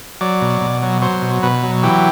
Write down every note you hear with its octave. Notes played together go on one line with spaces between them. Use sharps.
F#3 D5
B2
B2
F#3
F#3 C5
B2
B2 B4
F#3
E3 G4